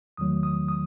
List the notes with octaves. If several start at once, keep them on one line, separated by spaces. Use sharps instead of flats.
E2 D#3 F#3 A3 D#6
D#6
D#6